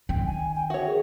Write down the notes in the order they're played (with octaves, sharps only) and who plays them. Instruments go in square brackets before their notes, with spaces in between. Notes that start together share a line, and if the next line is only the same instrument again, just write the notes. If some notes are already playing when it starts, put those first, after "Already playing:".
[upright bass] D#3 [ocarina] G5
[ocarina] G#5
G5
[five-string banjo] F#4 C#5 [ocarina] E5
[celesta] G#4 A#4